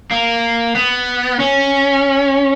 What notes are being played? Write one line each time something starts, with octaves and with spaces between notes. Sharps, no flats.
A#3
B3
C#4